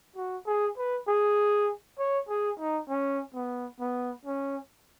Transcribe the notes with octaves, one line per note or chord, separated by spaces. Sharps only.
F#4
G#4
B4
G#4
C#5
G#4
D#4
C#4
B3
B3
C#4